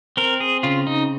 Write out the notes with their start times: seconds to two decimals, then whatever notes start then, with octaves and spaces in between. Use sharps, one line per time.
0.17 C4 A#4
0.40 G#4
0.63 C#3 F4
0.87 D#4